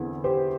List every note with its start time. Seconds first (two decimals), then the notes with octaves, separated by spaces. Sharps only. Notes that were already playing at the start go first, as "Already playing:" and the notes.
Already playing: E2 D3 C4 E4
0.24 G4 C5